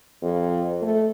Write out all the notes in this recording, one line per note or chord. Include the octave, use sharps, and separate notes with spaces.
F2
A3